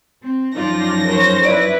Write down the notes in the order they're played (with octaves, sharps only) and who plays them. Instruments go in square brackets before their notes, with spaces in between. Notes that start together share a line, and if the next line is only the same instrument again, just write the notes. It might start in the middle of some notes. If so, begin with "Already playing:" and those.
[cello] C4
[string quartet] F#2 A#6 [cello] F3 D#4 [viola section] F4 D5
[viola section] A#4 C5 C#5
[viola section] E4 B4 [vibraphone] D5